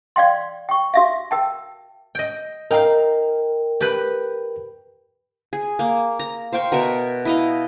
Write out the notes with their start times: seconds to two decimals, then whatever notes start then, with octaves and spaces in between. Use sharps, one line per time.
0.16 D5 F5 G5 C6
0.69 G5 C#6
0.94 F#4 E5 F5
1.31 A#4 G5 A5
2.15 D#5 G5
2.71 D#4 A#4 F5 G5
3.81 G4 B4
5.53 G#4
5.79 A#3
6.19 A#5
6.53 C5 F5 G5 C#6
6.72 B2 A#4 E5 C#6
7.25 E4 D#5 F5